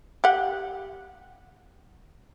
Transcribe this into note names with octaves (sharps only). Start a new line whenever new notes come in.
G4 F#5